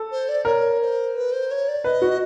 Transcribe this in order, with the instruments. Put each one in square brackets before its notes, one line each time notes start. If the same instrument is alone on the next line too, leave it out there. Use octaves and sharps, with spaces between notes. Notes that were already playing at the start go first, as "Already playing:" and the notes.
Already playing: [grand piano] A4
[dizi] C5
D5
[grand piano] A#4 [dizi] C#5
[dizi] C5
B4
C5
C#5
D5
[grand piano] B4 [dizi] D#5
[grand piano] F#4